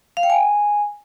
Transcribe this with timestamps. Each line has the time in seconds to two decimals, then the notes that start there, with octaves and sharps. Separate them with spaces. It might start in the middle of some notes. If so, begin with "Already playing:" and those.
0.17 F5
0.23 G5
0.30 G#5